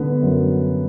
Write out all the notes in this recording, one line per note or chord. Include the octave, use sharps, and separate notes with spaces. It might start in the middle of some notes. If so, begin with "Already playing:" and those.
Already playing: D3 B3
F#2